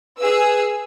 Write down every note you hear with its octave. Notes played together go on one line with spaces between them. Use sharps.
G#4 B4 E6